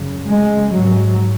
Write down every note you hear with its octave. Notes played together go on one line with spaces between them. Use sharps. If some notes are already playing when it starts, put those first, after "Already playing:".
Already playing: F#2 C#3
G#3
G#2 F#3